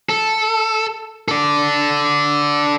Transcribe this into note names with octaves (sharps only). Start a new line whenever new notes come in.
A4
A4 D5